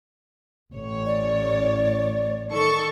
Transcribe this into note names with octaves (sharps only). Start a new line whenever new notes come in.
A1 C#5
D5
D#3 A4 C#6